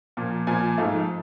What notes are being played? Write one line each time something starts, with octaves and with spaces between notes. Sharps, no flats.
A#2 F3 A#3
A#2 F3 A#3 G#5
G#2 F3 A3 F5